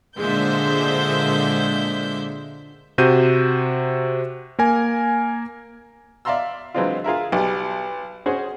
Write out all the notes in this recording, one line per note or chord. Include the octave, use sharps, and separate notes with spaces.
A#2 D3 G#3 C5 E5 G6
C3 F#4 C5 G6 D#7
A#3 A#4 G#5
D5 E5 F5 A#5 C6 E6
E3 F#3 G#3 C4 D4 F4
F4 G#4 A#4 E5
B1 G3
C#4 F#4 G#4 C5